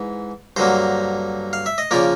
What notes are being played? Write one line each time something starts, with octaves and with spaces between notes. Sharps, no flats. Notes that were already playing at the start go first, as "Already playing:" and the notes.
Already playing: G#2 E3
G2 D3 F#3 A#3 C5
F5
E5
D#5
C#3 F3 A#3 D5